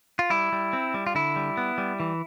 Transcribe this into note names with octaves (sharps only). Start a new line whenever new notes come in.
F4
G3 E4
G3
C4
G3
F4
D3 E4
G3
B3
G3
E3